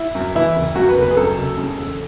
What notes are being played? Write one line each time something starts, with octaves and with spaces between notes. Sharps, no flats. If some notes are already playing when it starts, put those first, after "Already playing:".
Already playing: E4
F#2
E3 E4
F#1
F#2 F#4
B4
F#1
B4
G#4
F#2 A4
F#1
C#3
E1